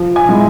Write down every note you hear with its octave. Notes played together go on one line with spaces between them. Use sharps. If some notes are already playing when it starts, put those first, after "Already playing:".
Already playing: F3
G#5
G#3 E4